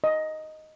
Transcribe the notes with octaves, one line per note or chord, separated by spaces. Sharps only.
D#5